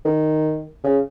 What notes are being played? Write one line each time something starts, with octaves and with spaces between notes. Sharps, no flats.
D#3
C#3